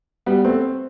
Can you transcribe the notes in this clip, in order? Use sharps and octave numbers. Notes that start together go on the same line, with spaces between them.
G3 B3
A3 C4